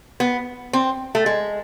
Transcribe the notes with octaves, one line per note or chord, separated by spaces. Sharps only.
B3
C4
A3
G#3